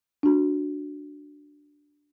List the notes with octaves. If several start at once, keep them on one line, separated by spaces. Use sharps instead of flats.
D4 F#4